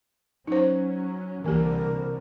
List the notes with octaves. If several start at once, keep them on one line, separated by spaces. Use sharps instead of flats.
F#3 C#4 D#4 C5
C2 D3 E3 A#3 G4 A#4